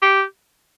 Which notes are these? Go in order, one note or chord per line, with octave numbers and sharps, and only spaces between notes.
G4